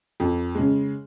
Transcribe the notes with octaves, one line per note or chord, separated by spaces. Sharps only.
F2
C#3 G#3